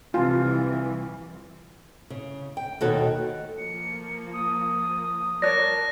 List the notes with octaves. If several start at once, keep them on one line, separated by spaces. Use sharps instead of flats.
C2 E3 F4
C#3
G5
D#2 B2 D#4 F#4 A4 C#5
F3 A#3 C#7
D#6
A#4 C#5 D5 A5 F#6 A#6